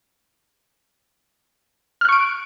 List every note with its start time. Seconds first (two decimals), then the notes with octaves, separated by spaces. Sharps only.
2.01 F6
2.05 F#6
2.09 C#6
2.12 D7